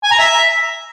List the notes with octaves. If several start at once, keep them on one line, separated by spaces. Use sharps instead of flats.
G#5
A#5
E5